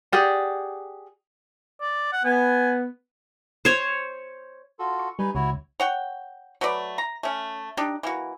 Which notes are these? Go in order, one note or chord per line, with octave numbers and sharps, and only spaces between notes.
G4 G#4 D5 F#5
D5
F#5
B3 G#5
C5 C#5
F4 F#4 A4
C#6
G3 D#4 B4 G#5
C#2 E4 F#4 C#5
C#5 F#5 G5
F#3 A3 B4 D5
A#5
A3 C#4
D4 D#4 G4
E3 A#3 F#4